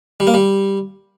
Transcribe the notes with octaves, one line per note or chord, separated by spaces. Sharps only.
G3
A#3
G3